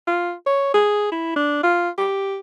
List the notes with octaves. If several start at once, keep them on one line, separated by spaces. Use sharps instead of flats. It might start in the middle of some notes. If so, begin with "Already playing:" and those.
F4
C#5
G#4
E4
D4
F4
G4